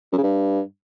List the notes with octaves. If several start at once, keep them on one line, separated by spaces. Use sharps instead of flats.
F#2
C#3
G2